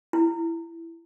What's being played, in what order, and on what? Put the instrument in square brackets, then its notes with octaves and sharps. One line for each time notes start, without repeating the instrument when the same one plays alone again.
[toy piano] E4